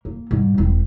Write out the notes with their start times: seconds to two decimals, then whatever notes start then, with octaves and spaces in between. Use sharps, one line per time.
0.05 A#3
0.31 G#2 G3
0.58 E1 C4